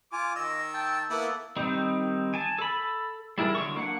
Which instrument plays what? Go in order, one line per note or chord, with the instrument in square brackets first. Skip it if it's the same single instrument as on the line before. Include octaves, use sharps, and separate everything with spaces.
[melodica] F4 G#5 [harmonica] D6
[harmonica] D#3 E6 [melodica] D#5
[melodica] G5 A5
[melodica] A#3 A4 [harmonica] B3 E4
[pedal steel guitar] D#3 G3 C4 D#4
G#5 A5
A4 B5
G3 E4 G#4 A#4
D3 F#3 C#6
A#3 D4 F#5